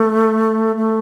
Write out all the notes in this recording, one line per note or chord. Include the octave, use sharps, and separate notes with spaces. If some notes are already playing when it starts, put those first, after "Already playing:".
Already playing: A3
A3